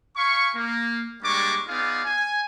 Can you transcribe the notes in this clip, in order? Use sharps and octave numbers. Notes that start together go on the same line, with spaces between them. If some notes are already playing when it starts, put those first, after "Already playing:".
F5 G#5 B5 C#6
A#3
G3 G#3 A#3 D4 C#6 D6
B3 D#4 F4 G#4 D5 F5
G#5